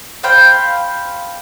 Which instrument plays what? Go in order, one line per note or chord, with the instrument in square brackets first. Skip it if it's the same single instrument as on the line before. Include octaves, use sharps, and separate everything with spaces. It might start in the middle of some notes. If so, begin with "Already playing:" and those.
[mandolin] C5 F5 G5 B5